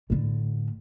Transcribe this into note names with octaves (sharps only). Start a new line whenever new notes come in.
A2 D3